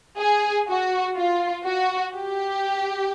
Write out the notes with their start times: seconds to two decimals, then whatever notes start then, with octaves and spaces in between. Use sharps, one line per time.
0.18 G#4
0.67 F#4
1.16 F4
1.66 F#4
2.15 G4